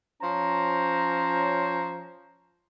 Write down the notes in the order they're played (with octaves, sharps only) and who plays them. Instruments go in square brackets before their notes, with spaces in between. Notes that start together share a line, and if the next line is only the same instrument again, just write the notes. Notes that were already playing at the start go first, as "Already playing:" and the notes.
[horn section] F3 C#4 C5 C#5 A#5